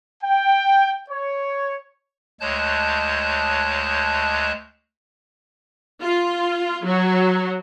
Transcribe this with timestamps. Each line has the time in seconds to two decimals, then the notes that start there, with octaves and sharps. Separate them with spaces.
0.22 G5
1.09 C#5
2.41 D2 G#3 C#5 A5 F#6 G6
6.02 F4
6.85 F#3